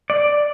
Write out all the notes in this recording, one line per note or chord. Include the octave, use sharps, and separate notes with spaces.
D5